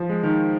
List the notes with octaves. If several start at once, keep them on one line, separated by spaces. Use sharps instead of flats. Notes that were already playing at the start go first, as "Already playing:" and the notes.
Already playing: F3
G#3
D#3